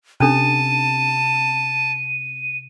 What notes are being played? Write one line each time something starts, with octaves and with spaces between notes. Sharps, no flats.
C3 C#4 D4 A4 A5 D#7